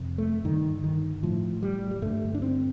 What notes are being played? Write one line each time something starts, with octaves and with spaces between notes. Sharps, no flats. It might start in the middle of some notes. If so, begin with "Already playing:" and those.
Already playing: F2 C3
A3
G2 D3 D#3
D#3
A2 F3
G3
G3
G2 D3 A3
D4
C4